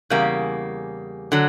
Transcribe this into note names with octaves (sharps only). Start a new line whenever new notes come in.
E2 C#3 G3 A#3
D3 F#3